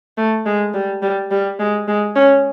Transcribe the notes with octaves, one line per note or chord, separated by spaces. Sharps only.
A3
G#3
G3
G3
G3
G#3
G#3
C#4